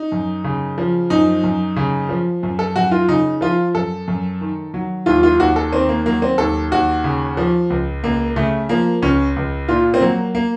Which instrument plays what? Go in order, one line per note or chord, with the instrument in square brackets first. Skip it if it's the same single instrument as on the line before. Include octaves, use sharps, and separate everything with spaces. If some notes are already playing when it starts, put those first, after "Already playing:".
Already playing: [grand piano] D#4
F#2
C#3
F3
F#2 D#4
F#2
C#3
F3
F#2
A4
F#2 F#4
F4
C#3 D#4
F3 F4
F#2 A4
F#2
D#3
F#3
D#2 F4
F4
D#2 F#4
A4
D#3 C4
A#3
F#3 A#3
C4
D#2 A4
D#2 F#4
C#3
F3
C#2
C#2 A#3
C#3 A3
F3 A#3
C#2 C#4
C#2
A#2 F4
C4
F#3 A#3
A#3